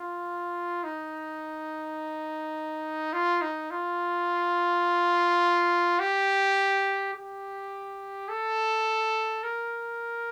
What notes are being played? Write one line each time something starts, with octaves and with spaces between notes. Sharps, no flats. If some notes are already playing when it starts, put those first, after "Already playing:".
Already playing: F4
D#4
F4
D#4
F4
G4
G4
A4
A#4